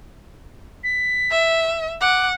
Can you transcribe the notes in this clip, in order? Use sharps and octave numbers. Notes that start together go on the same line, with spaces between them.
B6
E5
F#5 D6